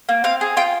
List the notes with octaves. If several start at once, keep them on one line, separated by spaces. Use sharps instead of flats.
A#3
C4 F5
G#4
F4 G5